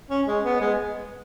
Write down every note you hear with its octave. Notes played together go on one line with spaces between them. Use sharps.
C#4
G#3
B3
G#3